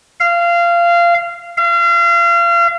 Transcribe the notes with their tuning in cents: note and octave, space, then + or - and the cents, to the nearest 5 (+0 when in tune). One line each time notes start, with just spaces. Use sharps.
F5 -20
F5 -35